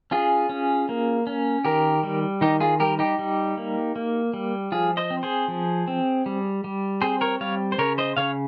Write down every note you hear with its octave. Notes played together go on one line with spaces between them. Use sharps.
C#4 F4 G#4
C#4
A#3
C#4
D#3 G4 A#4
G3
D#3 D#4 G4
F4 G#4
G3 G4 A#4
D#4 G4
G3
A#3
A#3
G3
F3 F4 G#4
C5 D#5
C4
G#4 C5
F3
C4
G3
G3
C4 G#4 C5
A#4 C#5
G3 C#5 F5
C5
C#3 A#4 C#5
C5 D#5
C#3 C#5 F5